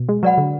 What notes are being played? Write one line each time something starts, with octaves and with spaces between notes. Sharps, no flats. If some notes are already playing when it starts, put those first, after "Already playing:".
Already playing: B2
G#3
F#3 B4 D5 F#5 B5
D3